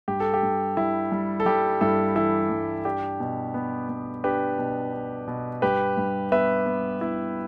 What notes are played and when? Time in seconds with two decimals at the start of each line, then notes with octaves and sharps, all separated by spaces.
0.08 G2 G4
0.20 A4
0.34 G4
0.43 G2
0.77 G3 E4
1.12 G3
1.40 A4
1.46 G3 G4
1.81 G2 E4 A4
2.15 E3 E4 A4
2.50 G2
2.85 D4 G4
3.20 B2
3.54 B3
3.89 B3
4.24 D4 G4 B4
4.58 B2
4.93 D4
5.27 B2
5.62 G2 G4 B4
5.97 G2
6.32 B3 B4 E5
6.66 B3
7.01 B3 E4